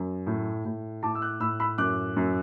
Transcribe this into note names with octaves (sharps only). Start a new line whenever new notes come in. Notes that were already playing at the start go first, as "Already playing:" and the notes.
Already playing: F#2
A2
A2
A2 A5 D6
E6
D6 F#6
A2 B5 E6
B5 E6
F#2 D6 F#6
F#2